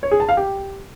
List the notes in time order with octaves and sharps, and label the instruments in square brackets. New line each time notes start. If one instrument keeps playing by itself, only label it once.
[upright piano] C#5
G#4
A5
F5
G4